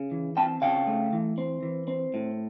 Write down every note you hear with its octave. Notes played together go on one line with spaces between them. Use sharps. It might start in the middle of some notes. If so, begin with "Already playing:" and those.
Already playing: C#3
E3
C4 G5 A5
C#3 F5 G5
A3
E3
C4
E3
C4
A2